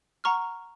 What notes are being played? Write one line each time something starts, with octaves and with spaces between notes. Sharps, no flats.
F#5 A#5 C#6 F6